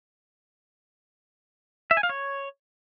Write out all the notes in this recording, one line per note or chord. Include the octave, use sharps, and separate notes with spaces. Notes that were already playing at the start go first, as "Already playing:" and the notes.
E5
G#5
F5
C#5